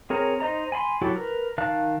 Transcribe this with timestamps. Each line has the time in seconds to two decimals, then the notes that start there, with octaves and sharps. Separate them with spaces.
0.10 C4 G#4 A#4 C#5 A#5
0.40 D#4 C5 D#5 A#5
0.72 G#5 B5 C6
1.01 F#3 E4 F#4 G4 A4
1.16 A#4 B4
1.58 D#3 F5 A5 F#6